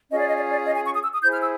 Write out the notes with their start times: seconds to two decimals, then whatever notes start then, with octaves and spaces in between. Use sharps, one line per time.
0.09 C#4 F4 G#4 D#5
0.19 D5
0.28 D#5
0.36 D5
0.51 D5
0.66 D#5
0.75 G#5
0.84 C#6
0.93 D#6
1.03 E6
1.13 D#6
1.22 E4 G#4 C5 G6
1.31 F6
1.41 E6